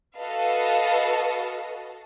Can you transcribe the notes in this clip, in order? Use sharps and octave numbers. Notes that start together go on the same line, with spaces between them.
F#4 A4 B4 D#5 F5